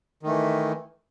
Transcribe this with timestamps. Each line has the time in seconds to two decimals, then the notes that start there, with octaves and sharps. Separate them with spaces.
0.23 D#3
0.26 A3
0.30 E3